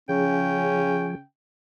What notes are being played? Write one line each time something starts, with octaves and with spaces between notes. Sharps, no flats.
C#3 F3 C#4 G#4 G5